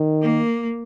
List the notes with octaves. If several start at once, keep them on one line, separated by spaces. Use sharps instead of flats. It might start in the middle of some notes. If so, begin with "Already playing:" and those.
Already playing: D#3
A#3